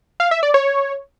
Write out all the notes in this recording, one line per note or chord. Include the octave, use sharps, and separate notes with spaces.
F5
E5
D5
C#5